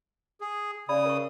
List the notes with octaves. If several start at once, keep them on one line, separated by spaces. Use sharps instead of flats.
G#4
C#3 D5 B5 D#6
A#4 C#6